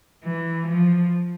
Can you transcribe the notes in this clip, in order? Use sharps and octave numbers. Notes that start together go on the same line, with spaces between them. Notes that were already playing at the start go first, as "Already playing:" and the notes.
E3
F3